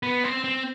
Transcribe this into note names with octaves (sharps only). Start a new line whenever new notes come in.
B3
C4
C4